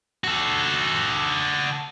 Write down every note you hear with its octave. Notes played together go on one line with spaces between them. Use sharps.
F#4 A4